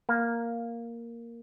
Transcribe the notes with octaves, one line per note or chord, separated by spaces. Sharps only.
A#3